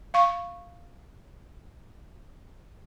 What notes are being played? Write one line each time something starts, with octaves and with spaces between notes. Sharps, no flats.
F5 C#6